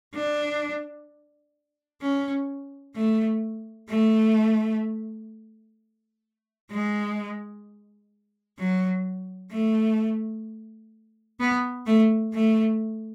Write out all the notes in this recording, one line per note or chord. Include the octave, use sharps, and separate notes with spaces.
D4
C#4
A3
A3
G#3
F#3
A3
B3
A3
A3